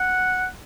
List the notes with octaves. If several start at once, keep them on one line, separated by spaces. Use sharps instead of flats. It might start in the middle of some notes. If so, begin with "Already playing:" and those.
Already playing: F#5